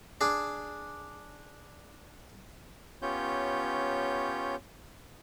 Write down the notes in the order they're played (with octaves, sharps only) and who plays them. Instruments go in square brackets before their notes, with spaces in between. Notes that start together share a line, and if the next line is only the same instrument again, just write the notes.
[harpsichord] D4 G#4
[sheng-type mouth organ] B3 C#4 F4 G4 C#5 G6